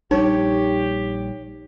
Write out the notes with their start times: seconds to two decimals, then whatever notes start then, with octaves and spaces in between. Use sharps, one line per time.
0.11 A#1 G3 D#4 G4 C#5